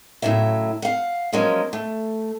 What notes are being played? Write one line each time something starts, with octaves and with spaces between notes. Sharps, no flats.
A2 C#3 E3 F#3 E5
F5 F#5
F3 F#3 G#3 A#3 C#4
A3